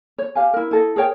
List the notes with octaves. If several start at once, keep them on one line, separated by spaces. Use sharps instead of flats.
C#5
G4 F5 G#5
E4 A#4
E4 A4 D#5
G#4 A#4 C#5 G5